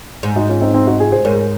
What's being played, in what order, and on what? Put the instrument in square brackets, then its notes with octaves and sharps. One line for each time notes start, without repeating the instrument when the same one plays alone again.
[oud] G#2
[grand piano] D#4 F#4
C#4 F4
C4 D#4
C4 D#4
D#4 F#4
F4 G#4
G#4 C5
[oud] G#2 [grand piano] A#4 C#5